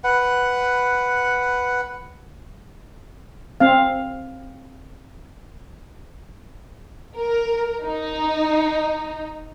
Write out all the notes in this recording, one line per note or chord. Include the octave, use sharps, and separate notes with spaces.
B4 F#5
C4 F5
A#4
D#4